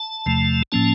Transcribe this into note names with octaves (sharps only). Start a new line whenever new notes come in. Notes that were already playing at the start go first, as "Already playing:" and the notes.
Already playing: A5
E2 C3 F3 A3
A2 F3 A#3 C#4 A5